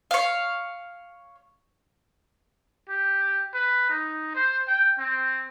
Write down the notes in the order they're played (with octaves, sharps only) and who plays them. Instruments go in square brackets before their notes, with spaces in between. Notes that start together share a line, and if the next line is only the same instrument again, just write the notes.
[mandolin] C#5 F5
[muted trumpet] G4
B4
D#4
C5
G5
C4